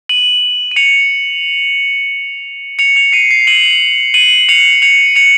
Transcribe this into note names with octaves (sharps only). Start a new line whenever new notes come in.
D#7 F#7
D#7
C#7 F7
C#7 F7
C#7 F7
C7 D#7
C7
D#7 F#7
D#7 F#7
C#7 F7
C#7 F7
C#7 F7